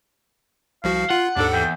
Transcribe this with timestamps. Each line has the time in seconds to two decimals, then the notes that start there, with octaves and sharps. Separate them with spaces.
0.84 C2 F3 F#4 F5
1.10 F4 F#5
1.36 D#2 G#2 D4 A4
1.53 E2 G5